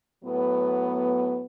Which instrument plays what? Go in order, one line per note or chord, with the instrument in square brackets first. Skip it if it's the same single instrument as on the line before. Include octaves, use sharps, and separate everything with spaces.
[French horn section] A2 F#3 B3